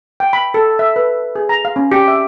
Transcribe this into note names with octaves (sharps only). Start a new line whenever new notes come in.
G5
B5
A4
E5
B4
G#4
A#5
F5
C#4
G4
E5